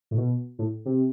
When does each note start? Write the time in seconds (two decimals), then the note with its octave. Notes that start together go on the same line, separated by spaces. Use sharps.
0.11 A2
0.18 B2
0.59 A2
0.86 C3